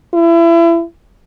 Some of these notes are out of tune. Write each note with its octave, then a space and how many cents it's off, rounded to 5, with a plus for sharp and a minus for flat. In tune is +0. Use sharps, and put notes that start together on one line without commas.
E4 +30